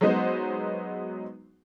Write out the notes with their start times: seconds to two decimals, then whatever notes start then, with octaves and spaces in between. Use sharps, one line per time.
0.01 F#3 G#3 B3 D#4 F#4 C5